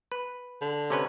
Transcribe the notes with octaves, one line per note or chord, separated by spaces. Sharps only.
B4
D3
C3 C#4 B4